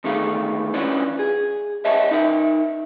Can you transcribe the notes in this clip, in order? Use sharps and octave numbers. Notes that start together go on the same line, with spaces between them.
E2 D3 D#3 A3 G#4 F5
E3 C#4 D4 F4 B4 C#5
G#4
B4 C#5 D#5 E5 A5
D#4 A#4 E5